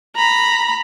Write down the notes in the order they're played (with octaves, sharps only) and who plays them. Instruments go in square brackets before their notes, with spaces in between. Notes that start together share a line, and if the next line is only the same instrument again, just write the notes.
[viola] A#5 B5